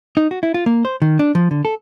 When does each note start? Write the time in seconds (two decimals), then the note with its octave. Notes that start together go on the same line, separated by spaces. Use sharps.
0.17 D#4
0.31 F#4
0.43 E4
0.54 F4
0.66 A#3
0.85 C5
1.02 D#3
1.19 D4
1.35 F3
1.51 D3
1.65 A4